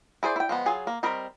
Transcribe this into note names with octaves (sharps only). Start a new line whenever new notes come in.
E4 G#4 C5 D5
E4 G5
F3 G#3 B3
F#3 F4 G#4 G#5
A#3
G3 C4 A#4 D#5 B5